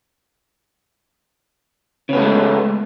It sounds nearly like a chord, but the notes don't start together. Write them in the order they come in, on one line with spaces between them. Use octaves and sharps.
C#3 B3 A3 G#3